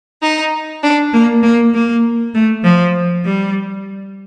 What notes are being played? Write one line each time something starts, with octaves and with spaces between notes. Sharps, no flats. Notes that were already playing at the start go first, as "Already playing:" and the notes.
D#4
D4
A#3
A#3
A#3
A3
F3
G3